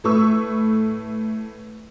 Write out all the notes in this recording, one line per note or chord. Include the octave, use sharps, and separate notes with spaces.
A2 A3 B4 C#6 E6